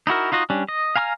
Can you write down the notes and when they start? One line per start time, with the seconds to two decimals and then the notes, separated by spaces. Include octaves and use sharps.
0.07 D#4 E4 F#4 A#4
0.32 D#4 F4 F#4 D#5
0.50 G3 C#4 D4
0.69 D#5
0.96 F5 G#5 A#5 C#6 F6